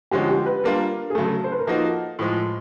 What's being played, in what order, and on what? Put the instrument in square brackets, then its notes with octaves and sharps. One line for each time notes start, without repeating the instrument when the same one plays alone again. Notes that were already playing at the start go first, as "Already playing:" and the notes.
[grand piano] D3 F3 G#3 C#4 F#4 [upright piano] G4
[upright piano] G4
B4
[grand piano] G3 A#3 D4 F4 [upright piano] A#4
[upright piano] G#4
[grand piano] C#3 F#3 A3 [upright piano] A4
[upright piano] C5
B4
A#4
[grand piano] F3 A#3 D#4 F#4 [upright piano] A4
[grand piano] A2 F3 G#3